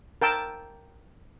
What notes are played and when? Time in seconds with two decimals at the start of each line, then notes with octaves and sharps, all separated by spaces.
0.22 A#4 G5 A5 E6